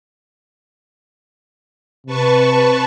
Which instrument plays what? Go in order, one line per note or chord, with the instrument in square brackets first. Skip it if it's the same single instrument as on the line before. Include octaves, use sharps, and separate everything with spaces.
[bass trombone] C3 [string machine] B4 A5 C#6